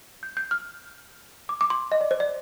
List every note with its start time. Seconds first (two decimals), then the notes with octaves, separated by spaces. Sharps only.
0.23 G6
0.37 G6
0.51 F6
1.49 D6
1.61 D6
1.70 C6
1.92 D#5
2.01 D5
2.11 C5
2.20 D5